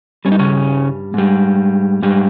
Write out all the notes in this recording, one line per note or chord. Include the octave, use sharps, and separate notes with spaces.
G2 G3 C#4
D#4
C#3 C#4
G#2 G3
G#2 G3